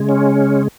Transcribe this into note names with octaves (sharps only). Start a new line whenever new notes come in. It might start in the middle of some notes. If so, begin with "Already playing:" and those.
Already playing: C#3 G#3
C#4